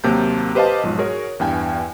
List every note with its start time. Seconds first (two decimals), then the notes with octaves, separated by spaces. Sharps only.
0.04 D#2 C3 F#3 A#3 A5 G6
0.55 G4 B4 C5 D#5 F5 A5
0.83 B1 G#2 F3
0.98 F#4 G#4 A#4 C#5
1.40 E2 G2 G5 G#5